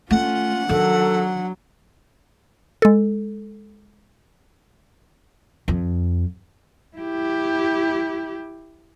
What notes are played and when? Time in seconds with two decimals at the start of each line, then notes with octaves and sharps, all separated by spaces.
0.11 A3 C#4 F4 F#5
0.69 D#3 F#3 D4 A4
2.82 G#3 A4
5.68 F2
6.97 E4 G4